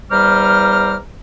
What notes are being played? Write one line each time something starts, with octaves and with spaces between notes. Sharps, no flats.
E2 G3 C5 A#5 D6 F6